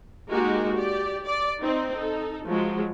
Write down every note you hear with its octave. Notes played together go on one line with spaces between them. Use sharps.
G#3 A#3 D#4 F#4 G4 A#4
G4 D5
D5
C4 D#4
D#4 A4
F3 F#3 G#3